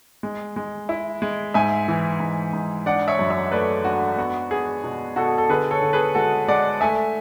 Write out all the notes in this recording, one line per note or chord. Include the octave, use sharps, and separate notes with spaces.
G#3
G#3
E4
G#3
G#2 E5 G#5
E3
G#2
G#2
D4 D5 F#5
C#5 E5
F#2
C#5 E5
A3 B4 D5
D4 F#4
B3 F#4
B3 G#4
B2
B2 F#4 A4
A4
D3 G#4 B4
A4 C#5
D3
G#4 B4
G#3 F#4 A4
G#3 D5 F#5
A3 E5 G#5